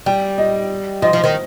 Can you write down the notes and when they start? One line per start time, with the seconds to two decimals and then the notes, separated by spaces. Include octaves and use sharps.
0.06 G3 G5
0.38 D#5
1.02 F3 D#5
1.13 F3
1.24 D#3